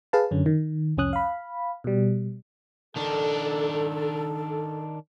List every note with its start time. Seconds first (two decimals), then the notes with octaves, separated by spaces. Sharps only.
0.13 G#4 B4 F5 A5
0.31 F#2 D3 C#4
0.46 D#3
0.97 C2 F2 C#4 D#6 F#6
1.13 F5 B5
1.84 B2 G3
2.96 D#3 D4 A4